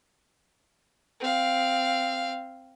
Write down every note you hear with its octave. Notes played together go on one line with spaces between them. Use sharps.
C4 F5